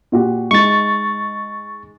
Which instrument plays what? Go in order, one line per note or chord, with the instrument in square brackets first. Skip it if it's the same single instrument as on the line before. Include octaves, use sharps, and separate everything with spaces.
[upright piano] A#2 F#4 G4
[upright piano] G#3 D#4 [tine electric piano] C#6 A6